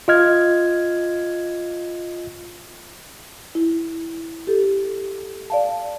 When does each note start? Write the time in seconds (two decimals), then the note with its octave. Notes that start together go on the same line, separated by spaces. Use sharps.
0.08 F4 D#5 F6 G#6
3.55 E4
4.47 G4 A4
5.50 D5 F5 A5